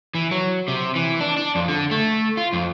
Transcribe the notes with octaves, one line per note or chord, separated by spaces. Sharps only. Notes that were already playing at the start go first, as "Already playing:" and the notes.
E3
F#3
C3
E3
D4
D4
F2
D3
A3
F4
F2